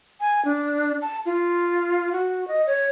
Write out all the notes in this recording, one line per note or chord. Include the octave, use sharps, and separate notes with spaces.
G#5
D4
A5
F4
F#4
D#5
C#5